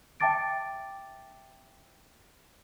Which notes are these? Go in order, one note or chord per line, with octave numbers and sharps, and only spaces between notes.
E5 G5 A5 D6 A6 D7